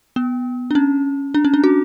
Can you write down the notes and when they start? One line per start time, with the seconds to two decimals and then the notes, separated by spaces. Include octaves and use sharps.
0.16 B3
0.71 D4
0.75 C#4
1.34 D4
1.45 C#4
1.54 D4
1.64 F#4